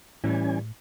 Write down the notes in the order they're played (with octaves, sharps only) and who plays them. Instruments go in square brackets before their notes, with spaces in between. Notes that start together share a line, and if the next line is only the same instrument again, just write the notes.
[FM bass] A2 [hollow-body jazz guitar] E3 G3 [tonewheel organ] C#4 G#5